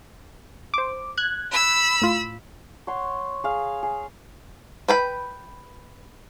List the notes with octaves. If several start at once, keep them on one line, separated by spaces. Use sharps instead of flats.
C5 D6
F#6 G#6
B5 E6
A2 F4
C#5 F#5 C6
G#4 F5
G#4
B4 G5 B5